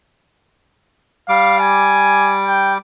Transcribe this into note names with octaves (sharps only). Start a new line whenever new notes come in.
G3 F5 D6
G#5
G5